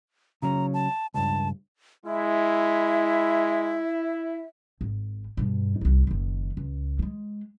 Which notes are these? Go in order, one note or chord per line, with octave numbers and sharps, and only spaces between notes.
C#3 F#3 C#4 A#5
A5
C#2 G2 A5
G#3 E4 E5
G#1
G2 B2
C2 D#4
F#1 D#3
C#2
G3 G#3